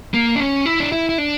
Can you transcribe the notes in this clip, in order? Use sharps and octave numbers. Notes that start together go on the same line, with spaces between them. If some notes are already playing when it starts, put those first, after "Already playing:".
A#3
D4
C#4
E4
D4
E4
E4
D4